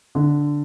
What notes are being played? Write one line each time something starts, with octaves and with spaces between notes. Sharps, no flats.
D3